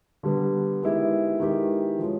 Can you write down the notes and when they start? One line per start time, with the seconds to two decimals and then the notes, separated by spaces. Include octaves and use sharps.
0.23 D3 G3 B3
0.82 D#3 G#3 B3 E4 G4
1.40 D#3 G#3 B3 E4 G4
1.99 F3 G#3 C#4